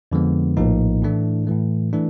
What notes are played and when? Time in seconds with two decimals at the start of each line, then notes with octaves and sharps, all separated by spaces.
0.12 F2 D3 F3 G#3 B3
0.57 A#1 A2 F3 A#3 D#4
1.02 A2 E3 A3 D4
1.47 A2 E3 A3
1.93 E3 A3 D4